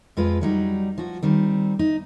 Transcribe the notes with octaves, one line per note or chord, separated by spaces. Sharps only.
F2 G#3 F4 B4
F#3 G3 D#4
F3 F#4
D#3 G3 C4
D#4